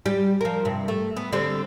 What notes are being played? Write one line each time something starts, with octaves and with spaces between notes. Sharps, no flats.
G3 G4
F3 A#4
G2 C3
A3
B3
D3 G3 C4